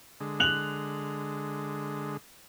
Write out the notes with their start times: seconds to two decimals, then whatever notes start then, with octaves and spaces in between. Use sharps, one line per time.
0.20 D3 G#3
0.40 F#6 F7 F#7